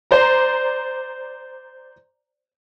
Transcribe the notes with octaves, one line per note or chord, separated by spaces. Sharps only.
C5 D5 A#5